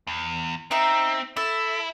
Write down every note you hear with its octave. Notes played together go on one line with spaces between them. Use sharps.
E2
C4 D#4 E5
E4 A4 E5